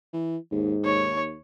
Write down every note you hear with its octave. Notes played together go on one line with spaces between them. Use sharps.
E3
D#2 G#2
D#2 C#5